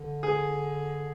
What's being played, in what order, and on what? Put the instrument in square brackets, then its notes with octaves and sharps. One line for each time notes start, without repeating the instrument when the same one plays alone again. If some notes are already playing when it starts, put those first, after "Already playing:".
Already playing: [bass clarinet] D3
[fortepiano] G#4